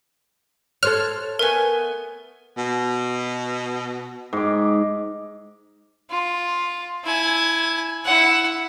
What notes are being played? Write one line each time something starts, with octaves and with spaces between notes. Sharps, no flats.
A4 C5 C#5 F6 F#6
A3 B3 A#4 B4 G#5
B2
G#2 D6
F4
E4 G#5
E4 F#5